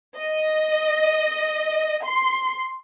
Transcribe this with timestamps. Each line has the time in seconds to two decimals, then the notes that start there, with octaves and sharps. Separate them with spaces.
0.17 D#5
2.04 C6